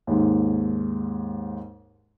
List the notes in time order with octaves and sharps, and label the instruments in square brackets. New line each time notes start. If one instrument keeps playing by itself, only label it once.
[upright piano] D#2 G#2